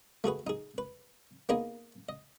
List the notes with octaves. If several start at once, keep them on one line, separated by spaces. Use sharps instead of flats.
A3 F#4 G#4 B4
D#4 G#4
B4
A#3 B3 D#4 G#4 D#5 G#5
D#5